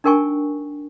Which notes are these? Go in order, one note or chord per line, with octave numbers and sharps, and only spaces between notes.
D4 D#4 A#4 G5 G#5 C#6